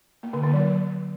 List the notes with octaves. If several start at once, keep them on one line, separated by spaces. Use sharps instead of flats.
A#3
D3
D3
F#3